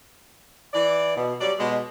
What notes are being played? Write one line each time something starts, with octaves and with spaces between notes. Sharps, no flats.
E3 D5
B2
F#3 G3 D5
B2 G#3